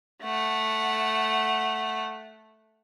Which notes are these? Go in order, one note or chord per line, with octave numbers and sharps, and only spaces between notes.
A3 F#5